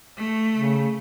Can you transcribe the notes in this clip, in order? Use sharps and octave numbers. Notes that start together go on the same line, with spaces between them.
A3
C#3